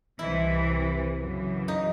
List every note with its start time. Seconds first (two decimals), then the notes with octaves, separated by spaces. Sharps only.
0.19 C2 C3 E3 E4
1.19 F#2 C#3 E3
1.68 D#4